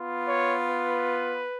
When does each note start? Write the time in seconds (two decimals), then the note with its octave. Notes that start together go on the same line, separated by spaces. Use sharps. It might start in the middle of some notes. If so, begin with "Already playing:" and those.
Already playing: B3 F4
0.28 C#5
0.67 B4